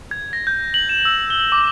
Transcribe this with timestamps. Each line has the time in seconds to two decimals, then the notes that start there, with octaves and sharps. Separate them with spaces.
0.11 G#6
0.33 A#6
0.47 G6
0.74 F#7
0.89 E7
1.05 E6
1.30 G7
1.52 D6